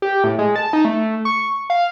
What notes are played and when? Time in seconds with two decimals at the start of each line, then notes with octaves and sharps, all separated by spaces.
0.02 G4
0.24 A2
0.39 G#3
0.56 A5
0.73 D#4
0.85 A3
1.25 C#6
1.70 F5